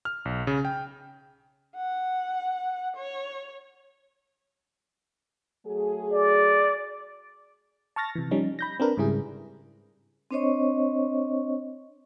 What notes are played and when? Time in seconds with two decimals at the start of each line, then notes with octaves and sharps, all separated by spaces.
0.05 F6
0.25 B1
0.47 C#3
0.65 G5
1.77 F#5
2.96 C#5
5.66 F#3 A3 G#4
6.12 D5
7.96 A5 C#6 F6 A6 A#6
8.15 C3 E3
8.31 F3 G3 C#4 D#4
8.59 B5 G6 A#6
8.80 C4 D4 A#4 B4
8.97 G#2 C#3 G3 E4 G#4
10.31 C4 D4 C5 C#5 D#5 C#6